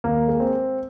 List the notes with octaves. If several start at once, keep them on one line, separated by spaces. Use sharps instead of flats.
D#2 A#3
G#3
C4